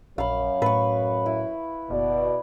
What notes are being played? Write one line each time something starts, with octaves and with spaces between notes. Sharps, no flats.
A#1 F#2 C#5 F5 B5
A2 B4 C#6
E4
F#1 B2 D5